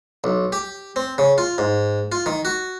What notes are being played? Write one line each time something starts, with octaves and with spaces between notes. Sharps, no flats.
B1
G4
C4
C#3
F4
G#2
F4
D#3
F#4